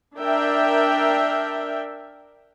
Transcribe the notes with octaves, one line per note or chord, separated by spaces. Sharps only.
D4 A#4 E5 G5